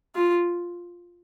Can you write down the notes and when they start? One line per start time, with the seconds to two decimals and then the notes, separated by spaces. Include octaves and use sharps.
0.15 F4